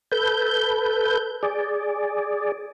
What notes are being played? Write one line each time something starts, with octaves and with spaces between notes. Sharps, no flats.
A4 B4 G6
G#4 D5